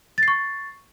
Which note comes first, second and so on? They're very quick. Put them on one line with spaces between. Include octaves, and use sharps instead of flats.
A6 C7 C#6